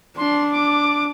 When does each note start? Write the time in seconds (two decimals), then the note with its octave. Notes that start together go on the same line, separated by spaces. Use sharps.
0.17 D4 C6
0.52 D6